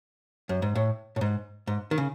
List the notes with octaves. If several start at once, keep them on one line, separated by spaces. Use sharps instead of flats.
F#2
G#2
A2
A2
G#2
G#2
D#3
C#3